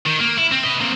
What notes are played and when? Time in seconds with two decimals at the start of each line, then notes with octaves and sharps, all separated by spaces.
0.06 D#3
0.20 A#3
0.38 E4
0.51 C4
0.63 B4 D#5
0.80 A#3 C4